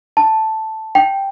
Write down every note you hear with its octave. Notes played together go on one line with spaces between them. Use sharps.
A5
G5